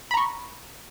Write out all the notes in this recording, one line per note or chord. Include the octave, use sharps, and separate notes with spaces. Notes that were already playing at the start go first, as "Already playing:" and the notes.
A#5 B5 C#6